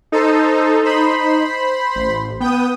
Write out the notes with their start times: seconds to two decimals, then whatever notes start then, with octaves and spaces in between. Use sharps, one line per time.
0.12 D#4 A4 C5
0.84 C5 B5 C6
1.96 A1
2.40 B3 G5 D#6